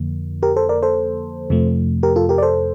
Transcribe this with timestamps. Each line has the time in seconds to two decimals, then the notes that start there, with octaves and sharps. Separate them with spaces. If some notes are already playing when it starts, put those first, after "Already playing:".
Already playing: F2 D3 F3 A#3
0.43 G4 A#4
0.56 A4 C5
0.69 A#4 D5
0.83 A4 C5
1.50 F2 C3 F3 A3
2.03 G4 A#4
2.16 F4 A4
2.29 G4 A#4
2.38 D5
2.42 A4 C5